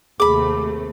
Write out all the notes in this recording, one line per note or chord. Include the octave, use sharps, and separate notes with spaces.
D#2 C3 A3 G#4 B5 D6